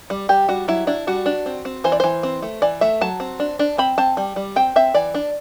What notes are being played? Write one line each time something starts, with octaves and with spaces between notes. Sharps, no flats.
G3
G3 G4
G3 F#4
F#3 E4
D4 E4
G3 F#4
D4
C4
C4
E3 C5
D5
E3 C5
C4
A3
E3 D5
A3 E5
F#3 A5
C4
D4
D4
C4 B5
C4 A5
G3
G3
C4 G5
C4 E5
E3 D5
D4